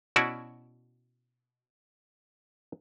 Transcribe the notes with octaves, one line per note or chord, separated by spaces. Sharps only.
B2 C#4 E4 F#4 D5 E5